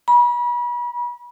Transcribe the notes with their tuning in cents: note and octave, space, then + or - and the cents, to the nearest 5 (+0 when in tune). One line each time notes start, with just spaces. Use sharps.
B5 -35